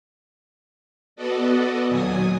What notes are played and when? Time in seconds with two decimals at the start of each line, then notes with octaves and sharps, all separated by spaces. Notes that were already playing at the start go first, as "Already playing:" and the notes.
1.16 B3 F#4 A4 D5 D#5
1.88 D#2 A#2 F#3 G#5 D#6